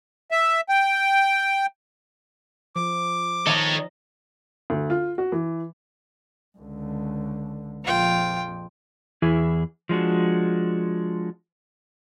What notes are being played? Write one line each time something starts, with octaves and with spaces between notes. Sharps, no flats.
E5
G5
F3 D6
D#3 A4 C#5 D#5 E5 A#5
D2
F4
F#4
E3
C#2 D3
A#1 F2 F4 G5
E2 E3 E4 G#4
F3 G#3 D4 F#4